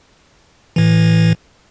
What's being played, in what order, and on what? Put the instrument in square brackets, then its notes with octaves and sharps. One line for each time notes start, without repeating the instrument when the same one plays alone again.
[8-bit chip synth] A2 E3